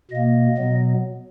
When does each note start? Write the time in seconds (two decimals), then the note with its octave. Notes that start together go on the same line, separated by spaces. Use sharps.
0.11 B2 A#3 D#5
0.58 B2 F#3 B3